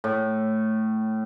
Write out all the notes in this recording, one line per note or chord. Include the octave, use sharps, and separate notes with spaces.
A2